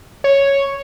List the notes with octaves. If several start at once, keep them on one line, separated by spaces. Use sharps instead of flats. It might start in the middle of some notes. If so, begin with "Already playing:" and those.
C#5